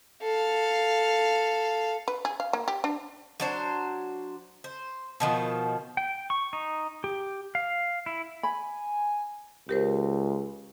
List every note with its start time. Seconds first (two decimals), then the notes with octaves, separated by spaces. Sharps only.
0.22 A4 F5
2.08 B4
2.25 G#4
2.40 F5
2.53 A#3
2.68 G4
2.84 D4
3.40 F#3 D4 C5
4.64 C5
5.20 B2 D#3 F3
5.97 G5
6.30 C#6
6.53 D#4
7.04 G4
7.55 F5
8.06 E4
8.43 G#5 B5
9.69 C#2 G4 A#4 C5